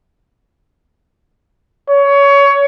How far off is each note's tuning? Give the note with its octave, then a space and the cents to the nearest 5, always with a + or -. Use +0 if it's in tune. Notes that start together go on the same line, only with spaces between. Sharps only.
C#5 +20